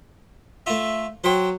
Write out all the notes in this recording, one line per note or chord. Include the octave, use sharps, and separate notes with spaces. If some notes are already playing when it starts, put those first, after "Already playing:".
A3 F4 E5
F#3 C5 G5